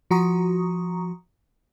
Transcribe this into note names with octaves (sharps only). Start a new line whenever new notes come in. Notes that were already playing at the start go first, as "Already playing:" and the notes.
F3 F#4 A#5 C#6 D#6